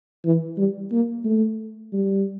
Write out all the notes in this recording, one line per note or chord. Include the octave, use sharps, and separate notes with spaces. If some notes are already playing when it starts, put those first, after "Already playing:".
E3
G3
A#3
A3
G3